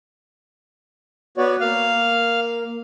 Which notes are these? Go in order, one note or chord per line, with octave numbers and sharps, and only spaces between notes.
B3 F#4 C#5 D5
A#3 F5